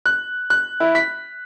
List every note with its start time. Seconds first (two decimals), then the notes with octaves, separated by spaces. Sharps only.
0.06 F#6
0.50 F#6
0.80 E4
0.95 B6